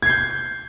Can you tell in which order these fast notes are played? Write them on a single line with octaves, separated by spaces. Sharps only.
G#6 C7 G6